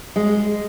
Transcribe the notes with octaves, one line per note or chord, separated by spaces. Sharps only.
G#3